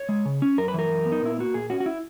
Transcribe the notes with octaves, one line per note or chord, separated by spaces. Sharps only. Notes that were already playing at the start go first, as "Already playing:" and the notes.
Already playing: C#5
G#3
C#3
C#4
F#2 A#4
B4
E3 A#4
F#2
B3
D#4
A#2 E4
A#3 F#4
A#2 G#4
C#4 F#4
F#4
E4